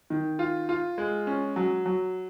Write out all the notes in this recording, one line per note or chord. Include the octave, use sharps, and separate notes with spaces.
D#3
F4
F4
G#3
C#4
F#3
F#3